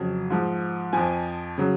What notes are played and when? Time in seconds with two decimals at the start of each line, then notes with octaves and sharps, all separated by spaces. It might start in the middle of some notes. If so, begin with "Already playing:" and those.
Already playing: F2 C#3 F#3
0.30 G#2 F3
0.93 F2 F3 G#5
1.58 C#3 F#3